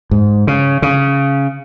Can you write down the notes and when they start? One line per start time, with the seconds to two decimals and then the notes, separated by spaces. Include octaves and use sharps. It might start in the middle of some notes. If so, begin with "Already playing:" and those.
0.11 G#2
0.47 C#3
0.82 C#3